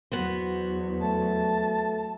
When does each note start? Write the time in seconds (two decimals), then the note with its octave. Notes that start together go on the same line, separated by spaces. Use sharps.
0.12 E2 F#3 B3 F#4 C5
1.00 A3 A5